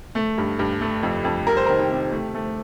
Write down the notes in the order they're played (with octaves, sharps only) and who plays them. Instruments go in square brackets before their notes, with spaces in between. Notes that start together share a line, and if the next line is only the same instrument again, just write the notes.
[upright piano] A3
G2
G2
A3
F2
F2
G3 A#4
C5
D#3 A#4
G4
C3
A3
A3